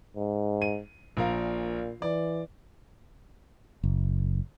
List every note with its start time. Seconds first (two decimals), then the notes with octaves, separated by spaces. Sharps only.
0.16 G#2
0.62 D#7
1.17 A#1 A#2 A#4 F5
2.02 E3 D5
3.84 F#1